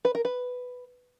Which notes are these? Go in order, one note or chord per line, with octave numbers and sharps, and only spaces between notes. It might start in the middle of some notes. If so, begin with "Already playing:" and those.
B4
A#4
B4